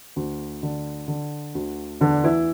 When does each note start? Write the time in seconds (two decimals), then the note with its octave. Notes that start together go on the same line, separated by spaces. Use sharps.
0.16 D2
0.63 D3
1.08 D3
1.55 D2
2.01 E2 D3 D4
2.24 E3 E4